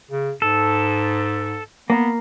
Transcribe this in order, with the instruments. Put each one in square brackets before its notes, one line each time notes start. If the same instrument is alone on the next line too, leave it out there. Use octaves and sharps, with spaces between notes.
[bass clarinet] C#3
[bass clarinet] G#2 [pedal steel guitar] A4
[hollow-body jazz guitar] A#3 [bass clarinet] B3